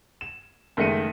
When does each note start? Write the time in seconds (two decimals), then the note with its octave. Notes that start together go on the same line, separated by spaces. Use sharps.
0.21 E7
0.77 F#1 D#3 G#3 A3 C#7 D#7